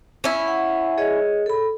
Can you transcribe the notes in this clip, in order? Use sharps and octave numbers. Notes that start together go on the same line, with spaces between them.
C#4 E4
F#5
G#4 C#5 D#5
A4 B5